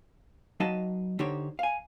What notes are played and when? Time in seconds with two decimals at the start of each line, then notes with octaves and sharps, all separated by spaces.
0.60 F#3 D#4 B4 D#5 F5 A5
1.19 D3 D#4 G4 C5 C#5
1.59 F5 G#5